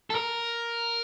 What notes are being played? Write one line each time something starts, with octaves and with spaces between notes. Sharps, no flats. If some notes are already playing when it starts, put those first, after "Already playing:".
A4
A#4